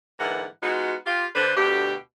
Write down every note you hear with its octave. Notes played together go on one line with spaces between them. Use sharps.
G#2 D3 E3 A#3 B4 F#5
G#3 B3 D#4 F4 F#4
F4 G4
D3 B4 C5
D2 B2 D3 G4